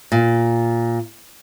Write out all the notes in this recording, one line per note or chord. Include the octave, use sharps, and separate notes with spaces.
A#2